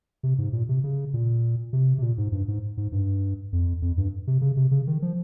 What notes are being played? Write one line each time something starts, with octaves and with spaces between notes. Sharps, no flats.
C3
G#2
A#2
C3
C#3
A#2
C3
C3
A#2
G#2
G2
G#2
G#2
G2
F2
F2
G2
C3
C#3
C3
C#3
D#3
F3